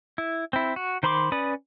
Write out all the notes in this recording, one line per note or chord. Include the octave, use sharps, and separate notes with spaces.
E4
C4 E4
F#4
D#3 C5 B5 C6 D6
C#4 B4 D5 B5 D#6